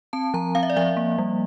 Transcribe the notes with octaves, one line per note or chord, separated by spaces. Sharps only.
C4 A5
F3 A#5
C4 F5
E5
D5
F3 E5
A#3
G3